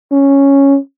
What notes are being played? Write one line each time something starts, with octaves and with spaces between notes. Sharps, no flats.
C#4